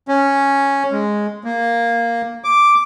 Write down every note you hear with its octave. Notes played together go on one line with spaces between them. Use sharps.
C#4
G#3
A#3
D6